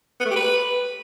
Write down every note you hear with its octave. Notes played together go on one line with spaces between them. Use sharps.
B3
A3
G4
B4